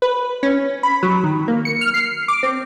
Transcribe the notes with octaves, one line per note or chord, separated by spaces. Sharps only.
B4
C#4
B5
F#3
D#3
A#3
C#7
F6
C7
D6
C4